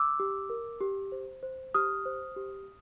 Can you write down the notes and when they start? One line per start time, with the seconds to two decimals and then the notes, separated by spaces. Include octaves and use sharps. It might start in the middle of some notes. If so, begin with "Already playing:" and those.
Already playing: D6 E6
0.20 G4
0.50 A#4
0.81 G4
1.12 C5
1.43 C5
1.75 G4 D#6 F6
2.06 C5
2.37 G4